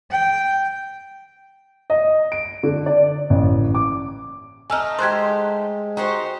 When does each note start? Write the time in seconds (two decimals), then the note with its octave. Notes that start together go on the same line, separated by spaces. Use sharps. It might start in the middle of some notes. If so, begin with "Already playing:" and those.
0.11 G5
1.90 D#5
2.32 D7
2.63 D3
2.86 D5
3.30 A1
3.75 D6
4.70 A3 D#4 G#5 E6 F6
4.99 G#3 G4 C5 C6 F#6 G#6
5.97 D#4 F#4 G4 C5